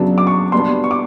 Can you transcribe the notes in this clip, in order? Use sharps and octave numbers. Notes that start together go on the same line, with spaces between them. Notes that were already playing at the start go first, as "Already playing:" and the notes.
Already playing: F#2 C#3 F#3 B3 D4
D6
C#6
B2 G3 B3 D4 C6
C#6
D6